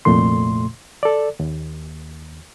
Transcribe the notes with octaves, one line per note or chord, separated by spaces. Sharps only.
C2 F2 A#2 A3 C6
A4 D5
D#2